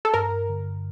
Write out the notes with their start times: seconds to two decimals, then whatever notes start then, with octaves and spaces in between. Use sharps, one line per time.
0.05 A4
0.14 G2 A#4
0.49 D3